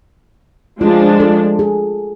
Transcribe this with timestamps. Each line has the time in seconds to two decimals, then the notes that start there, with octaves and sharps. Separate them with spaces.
0.81 F3 G#3 D4 F4
1.20 A4
1.59 G#4